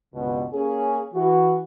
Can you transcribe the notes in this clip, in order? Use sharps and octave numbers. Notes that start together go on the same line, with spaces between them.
C#2 G2 B2
A#3 C#4 G#4
E3 F#4